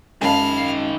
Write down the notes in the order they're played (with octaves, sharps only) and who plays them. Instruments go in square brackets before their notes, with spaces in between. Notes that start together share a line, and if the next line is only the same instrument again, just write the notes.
[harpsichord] F#2 G#3 [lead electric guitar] D#3 B5 [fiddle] F5 [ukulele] G#5 A5